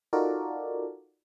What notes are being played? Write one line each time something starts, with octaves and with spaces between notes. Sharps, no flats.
D#4 F4 F#4 A4 A#4 D5